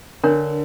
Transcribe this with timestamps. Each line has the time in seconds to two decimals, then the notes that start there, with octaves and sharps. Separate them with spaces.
0.24 D3 D4 A#4 C#5